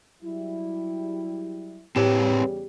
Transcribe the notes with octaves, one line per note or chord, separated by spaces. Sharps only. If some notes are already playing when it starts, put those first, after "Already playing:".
F#3 G3 E4
E2 A2 C#3 G3 C4 G4 B4 C#5